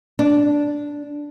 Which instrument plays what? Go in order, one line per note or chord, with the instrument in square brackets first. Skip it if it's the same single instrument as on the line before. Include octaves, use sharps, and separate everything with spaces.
[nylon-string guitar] D4